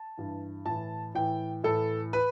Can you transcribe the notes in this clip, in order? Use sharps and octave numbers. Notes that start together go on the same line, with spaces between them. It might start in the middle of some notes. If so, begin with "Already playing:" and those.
Already playing: A5
G2 E3
A2 E3 A5
A2 E3 G5
A2 E3 A4
B4